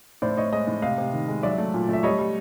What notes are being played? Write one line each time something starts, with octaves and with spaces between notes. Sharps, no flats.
A2 C5 D5
A2 C#5 D#5
G#3 C#5 D#5
A2
C3 D#5 F5
C3
D#3
G#3
F#3 D5 E5
A3
A#2
A3 E5
G3 C#5 D#5
G3